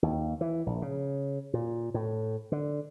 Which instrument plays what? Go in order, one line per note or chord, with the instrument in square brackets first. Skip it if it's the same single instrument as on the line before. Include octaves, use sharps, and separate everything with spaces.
[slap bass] D#2
E3
A#1
C#3
A#2
A2
D3